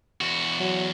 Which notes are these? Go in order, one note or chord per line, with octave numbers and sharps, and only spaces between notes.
E2 F#4
F#3